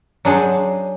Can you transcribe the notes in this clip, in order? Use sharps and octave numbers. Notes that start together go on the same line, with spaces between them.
F#3 D4 G#4 C5